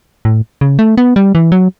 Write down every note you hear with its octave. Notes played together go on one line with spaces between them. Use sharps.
A2
C#3
A3
B3
G3
E3
F#3